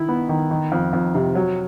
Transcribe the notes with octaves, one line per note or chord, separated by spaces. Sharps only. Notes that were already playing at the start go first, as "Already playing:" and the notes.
Already playing: D#3 E4
B3
D#3
D#3
F2
F2
C3
F#3